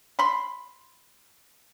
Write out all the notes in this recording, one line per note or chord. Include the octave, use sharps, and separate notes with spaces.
B5 C6